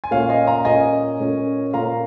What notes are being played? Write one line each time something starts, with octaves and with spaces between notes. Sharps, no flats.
G#5
A#2 A#3 C#4 C#5 F5
D#5 G#5
F5 A#5
A#2 A#3 C#4 D#5 G#5
A#2 A#3 C#4
A#2 A#3 C#4 F5 A#5